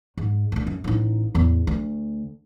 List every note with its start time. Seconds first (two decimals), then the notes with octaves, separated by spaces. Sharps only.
0.17 G#2
0.52 D2 G#2
0.67 F#2
0.84 A1 D#4
1.34 A1 E2
1.67 D2